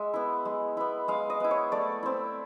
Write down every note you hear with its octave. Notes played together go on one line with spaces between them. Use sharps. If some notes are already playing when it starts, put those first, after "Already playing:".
Already playing: G#3 E5
B3 E4
G#3
B3 E4
G#3 F5
D#5
B3 E4
C#5
A3 D5
C4 E4